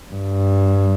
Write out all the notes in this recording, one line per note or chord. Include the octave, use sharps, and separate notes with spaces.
G2